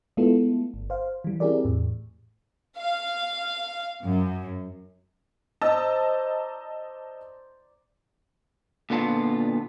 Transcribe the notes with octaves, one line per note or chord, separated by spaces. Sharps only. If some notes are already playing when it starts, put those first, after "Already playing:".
G#3 A3 B3 E4 F4 A4
G1
C5 F5
E3 G3
C4 E4 G4 G#4 A#4 D5
E2 A2
F5
F#2
C5 D5 D#5 A5 A#5 E6
A#2 D3 B3 F4 A5